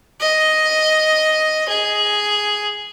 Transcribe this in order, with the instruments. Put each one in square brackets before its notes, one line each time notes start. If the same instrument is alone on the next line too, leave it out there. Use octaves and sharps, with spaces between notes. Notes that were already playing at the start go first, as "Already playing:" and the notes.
[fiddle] D#5
G#4